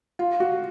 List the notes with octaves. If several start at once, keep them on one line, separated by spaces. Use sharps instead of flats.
F4
F#4